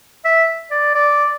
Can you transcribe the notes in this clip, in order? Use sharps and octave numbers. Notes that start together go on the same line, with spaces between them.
E5
D5
D5